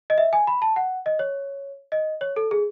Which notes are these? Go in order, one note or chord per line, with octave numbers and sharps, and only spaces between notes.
D#5
E5
G#5
B5
A5
F#5
D#5
C#5
D#5
C#5
A4
G#4